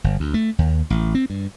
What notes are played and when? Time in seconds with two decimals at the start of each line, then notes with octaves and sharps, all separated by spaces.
0.04 G1
0.20 D2
0.34 A3
0.59 D#2
0.90 A1
1.15 C4
1.30 G2